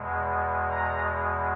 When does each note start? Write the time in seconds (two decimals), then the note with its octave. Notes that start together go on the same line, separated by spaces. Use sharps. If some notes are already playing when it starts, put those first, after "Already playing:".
Already playing: E2 B2 G#3
0.71 A#5